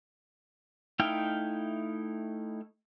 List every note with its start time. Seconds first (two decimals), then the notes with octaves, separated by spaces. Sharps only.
0.99 A3 D#4 E4 F5 G5